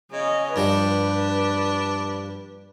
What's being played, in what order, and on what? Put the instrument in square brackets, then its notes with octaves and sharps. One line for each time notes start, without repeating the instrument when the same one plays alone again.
[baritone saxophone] C#3 [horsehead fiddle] D#5
[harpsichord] G2 F3 G3 [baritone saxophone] D4 [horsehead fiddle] B4